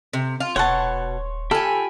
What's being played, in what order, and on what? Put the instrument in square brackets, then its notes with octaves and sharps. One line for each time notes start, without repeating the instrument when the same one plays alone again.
[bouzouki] C3
F4
[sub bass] D#1 [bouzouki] B2 [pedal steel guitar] C#5 C6 C#6 [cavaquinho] F#5 A5
[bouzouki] F4 G#5 [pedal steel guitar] G4 G5 B5 [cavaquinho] A4